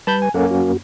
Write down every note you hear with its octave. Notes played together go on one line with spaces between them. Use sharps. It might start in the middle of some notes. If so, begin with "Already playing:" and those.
G3 B4 A5 B5 G6
G#5
F#2 A#3 C#4 A4 F#5
F#4